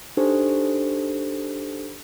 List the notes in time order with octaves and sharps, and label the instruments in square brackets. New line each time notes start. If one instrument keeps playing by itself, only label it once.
[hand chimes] D4 D#4 G4 A4 C5